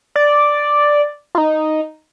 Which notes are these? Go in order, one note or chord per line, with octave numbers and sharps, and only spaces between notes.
D5
F4
D#4